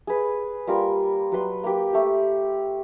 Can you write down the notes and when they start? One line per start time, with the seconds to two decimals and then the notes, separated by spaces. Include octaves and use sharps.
0.07 G#4 B4
0.67 G3 A#3 F4 A#4
1.32 F#3 B4 C6
1.64 A#3 G4
1.93 A3 G4